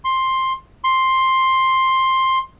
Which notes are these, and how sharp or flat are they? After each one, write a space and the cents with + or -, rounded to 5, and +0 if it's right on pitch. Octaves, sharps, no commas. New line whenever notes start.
C6 +10
C6 +10